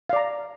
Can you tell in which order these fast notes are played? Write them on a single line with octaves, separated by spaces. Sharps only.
F5 D5 A#5